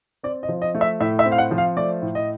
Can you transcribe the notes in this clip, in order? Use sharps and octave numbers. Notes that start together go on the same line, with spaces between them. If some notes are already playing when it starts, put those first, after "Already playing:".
C4 D5
D#5
F3
D#5
A3
E5
A2 E5
E5
C4
F5
F#5
F3
F5
A3 D5
A2
D#5